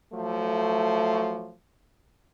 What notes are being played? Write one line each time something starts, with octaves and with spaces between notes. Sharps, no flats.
F3 F#3 A3